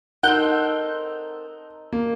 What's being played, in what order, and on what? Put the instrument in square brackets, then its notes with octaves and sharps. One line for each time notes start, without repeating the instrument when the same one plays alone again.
[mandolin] C4 A4 A#4 [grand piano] D#4 [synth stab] F#5 G6
[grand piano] A#3